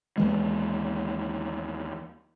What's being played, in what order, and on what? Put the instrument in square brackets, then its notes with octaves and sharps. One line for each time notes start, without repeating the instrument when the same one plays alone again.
[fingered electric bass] D#2 E3 G#3